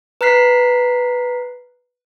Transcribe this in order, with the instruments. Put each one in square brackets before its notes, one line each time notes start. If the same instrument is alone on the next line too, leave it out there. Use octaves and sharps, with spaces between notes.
[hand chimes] B4 A#5 F6 F#6 B6 C7